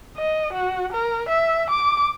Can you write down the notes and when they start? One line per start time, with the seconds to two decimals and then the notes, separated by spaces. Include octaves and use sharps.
0.18 D#5
0.53 F#4
0.92 A#4
1.29 E5
1.70 D6